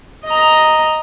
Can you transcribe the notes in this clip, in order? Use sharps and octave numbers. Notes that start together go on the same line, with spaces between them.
D#5 A#5